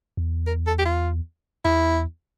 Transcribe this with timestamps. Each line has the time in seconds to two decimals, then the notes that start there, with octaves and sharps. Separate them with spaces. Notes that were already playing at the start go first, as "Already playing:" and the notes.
0.17 E2
0.47 A#4
0.67 A4
0.79 G4
0.85 F4
1.65 E2 E4